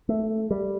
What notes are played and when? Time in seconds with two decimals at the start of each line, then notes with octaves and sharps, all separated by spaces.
0.09 A3
0.51 G3